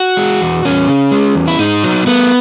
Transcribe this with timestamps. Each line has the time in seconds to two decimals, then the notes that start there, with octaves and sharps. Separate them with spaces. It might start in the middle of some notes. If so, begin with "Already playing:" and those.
Already playing: F#4
0.17 G#3
0.41 E2
0.65 E2 C#4
0.88 C#3
1.12 G#3
1.35 E2
1.48 E4
1.59 G#2 D#4
1.83 F#3
2.07 A3 B3